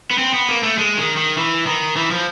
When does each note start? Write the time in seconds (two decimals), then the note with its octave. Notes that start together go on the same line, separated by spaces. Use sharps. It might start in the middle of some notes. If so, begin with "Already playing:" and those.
0.11 B3
0.18 C4
0.34 B3
0.49 A#3
0.63 A3
0.78 G#3
0.97 D#3
1.17 D#3
1.37 E3
1.66 D#3
1.96 E3
2.11 F3